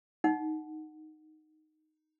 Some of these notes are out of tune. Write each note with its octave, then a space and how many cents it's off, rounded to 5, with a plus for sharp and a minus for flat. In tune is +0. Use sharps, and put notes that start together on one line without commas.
D#4 -5 F#5 +0